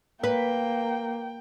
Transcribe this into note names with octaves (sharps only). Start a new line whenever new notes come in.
A#3 B4 G5